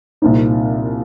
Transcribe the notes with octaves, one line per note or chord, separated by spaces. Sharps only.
C2 A#2 F3 D#4